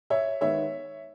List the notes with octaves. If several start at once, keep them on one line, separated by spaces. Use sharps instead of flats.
C#5 E5
D#3 G#3 B3 C#5 E5